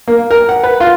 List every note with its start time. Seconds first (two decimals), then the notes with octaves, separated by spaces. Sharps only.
0.08 A#3
0.31 A#4
0.49 F#5
0.64 B4
0.80 F4